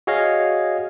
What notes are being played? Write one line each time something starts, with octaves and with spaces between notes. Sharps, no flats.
F#4 G#4 C#5 D#5 F5